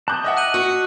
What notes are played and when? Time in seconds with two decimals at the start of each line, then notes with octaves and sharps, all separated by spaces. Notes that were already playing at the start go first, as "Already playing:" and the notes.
0.08 A5 D6 D#6 F#6 G6
0.24 D#5 E5 F#5
0.37 F#6 D#7 F#7
0.54 F#4